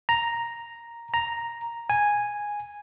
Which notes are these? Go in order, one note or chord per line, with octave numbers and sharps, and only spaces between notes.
A#5
A#5
G#5